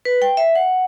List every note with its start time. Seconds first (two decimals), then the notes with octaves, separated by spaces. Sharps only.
0.05 B4
0.22 G5
0.37 E5
0.55 F#5